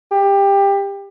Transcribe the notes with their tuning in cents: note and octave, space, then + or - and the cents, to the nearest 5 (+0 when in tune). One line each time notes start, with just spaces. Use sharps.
G4 +20